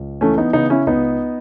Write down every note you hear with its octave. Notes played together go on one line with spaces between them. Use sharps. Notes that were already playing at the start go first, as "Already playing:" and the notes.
Already playing: C#2
E3 A3 C#4
B3 D#4
C#3 B3 D#4
C#4 E4
C#2 B3 D#4